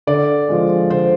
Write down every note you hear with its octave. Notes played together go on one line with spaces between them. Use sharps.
D3 D5
F3 G#3
D3 C5